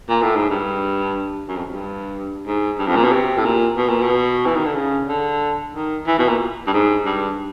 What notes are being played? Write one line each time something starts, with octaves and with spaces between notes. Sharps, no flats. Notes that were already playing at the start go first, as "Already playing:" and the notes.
A#2
A2
G#2
G2
F#2
F2
G2
G#2
G2
F2
A#2
B2
C3
A2
A#2
B2
A#2
B2
E3
D#3
D3
C#3
D3
D#3
E3
B2
A#2
G2
G#2
G2